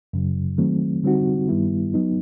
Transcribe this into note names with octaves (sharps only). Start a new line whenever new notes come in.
F#2 C#3 F#3
D#3 F#3 A3 C4
D3 G3 C4 D#4 F#4
G2 D#3 G3 B3 E4
F#3 B3 D#4